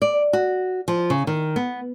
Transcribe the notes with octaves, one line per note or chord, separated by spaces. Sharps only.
D5
F#4
F3
C#3
D#3
B3